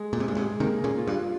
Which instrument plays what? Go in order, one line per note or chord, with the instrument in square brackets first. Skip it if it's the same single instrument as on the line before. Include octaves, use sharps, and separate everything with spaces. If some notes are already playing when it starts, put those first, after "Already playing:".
Already playing: [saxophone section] G#3
[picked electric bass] A#2
C3
[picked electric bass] G2 A#2 [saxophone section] G#4
[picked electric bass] G#2 C3
[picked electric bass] C3 D#3 [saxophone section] A#3
[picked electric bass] A#2 C#3
[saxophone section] F4
[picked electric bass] G2